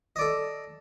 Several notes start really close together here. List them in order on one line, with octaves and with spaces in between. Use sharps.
D#5 D5 A4